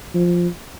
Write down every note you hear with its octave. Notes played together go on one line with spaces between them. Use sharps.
F3